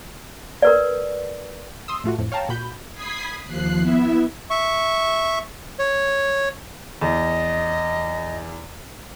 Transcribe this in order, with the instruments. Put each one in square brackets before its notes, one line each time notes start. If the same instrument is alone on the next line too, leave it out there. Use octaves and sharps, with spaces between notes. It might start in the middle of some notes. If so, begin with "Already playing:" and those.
[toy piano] A#4 B4 D5
[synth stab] C6 D#6 E6
A2 A3 F4 F#4
F2 A2
C#5 F5 G5 A5 A#5
A#2 F#4 B5 G6
[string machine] B5 D#6 G#6 B6 C7
D#2 F3 F#6 C7
B3 E4 E5
[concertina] E5 C#6
C#5
[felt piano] E2 [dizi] D#5